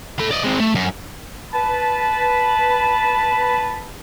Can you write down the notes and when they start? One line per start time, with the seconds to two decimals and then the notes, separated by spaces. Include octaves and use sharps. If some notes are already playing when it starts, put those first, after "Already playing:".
0.20 A4 B5
0.31 D5 D#5
0.43 G#3 C4
0.60 A3
0.75 F#2
1.53 B4 A5 B5